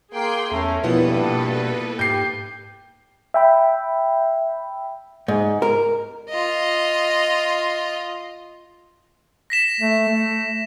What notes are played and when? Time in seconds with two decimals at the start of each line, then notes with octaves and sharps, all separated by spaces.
0.14 A#3 G#4 G5 C6
0.51 E2 A3 C#4 A#4
0.83 G2 B2 F3 A#3 B3 E4 A4 B4
1.29 B2
1.99 G#2 G4 G6 C7
3.34 E5 G5 B5
5.28 G#2
5.62 A#4
6.29 F4 D#5
9.50 A#6 B6 E7
9.80 A3
10.09 A3